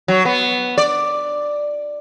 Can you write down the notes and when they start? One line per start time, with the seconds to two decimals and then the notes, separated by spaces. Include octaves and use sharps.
0.08 F#3
0.25 B3
0.78 D5